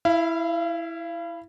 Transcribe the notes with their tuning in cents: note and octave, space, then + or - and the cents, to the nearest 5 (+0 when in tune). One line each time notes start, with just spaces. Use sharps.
E4 +0 F5 -40